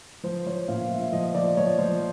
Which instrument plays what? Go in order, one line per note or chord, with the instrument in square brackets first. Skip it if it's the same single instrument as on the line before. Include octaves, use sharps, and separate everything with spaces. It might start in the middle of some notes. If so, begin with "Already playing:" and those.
[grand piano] F3 C5
F3 C#5
A#2 F5
F3 E5
F3 D#5
F3 D5
F3 C#5
F3 C5